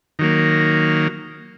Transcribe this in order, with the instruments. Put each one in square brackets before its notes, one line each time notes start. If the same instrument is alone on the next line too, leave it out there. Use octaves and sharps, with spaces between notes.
[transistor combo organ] D#3 F#3 A#3